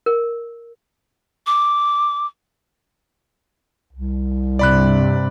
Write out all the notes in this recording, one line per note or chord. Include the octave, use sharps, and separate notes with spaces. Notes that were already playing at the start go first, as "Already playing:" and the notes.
A#4
D6
C2
G2 C3 D5 B5 F#6